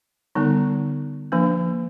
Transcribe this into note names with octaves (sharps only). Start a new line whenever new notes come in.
D3 G3 B3 D#4
F3 A#3 D4